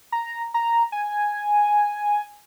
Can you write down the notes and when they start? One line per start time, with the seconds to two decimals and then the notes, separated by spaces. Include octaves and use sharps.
0.12 A#5
0.54 A#5
0.92 G#5